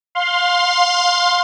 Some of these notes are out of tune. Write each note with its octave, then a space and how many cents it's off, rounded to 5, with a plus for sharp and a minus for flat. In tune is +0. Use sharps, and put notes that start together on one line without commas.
F5 +25 C6 +0